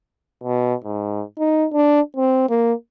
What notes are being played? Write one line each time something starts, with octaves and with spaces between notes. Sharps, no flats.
B2
G#2
D#4
D4
C4
A#3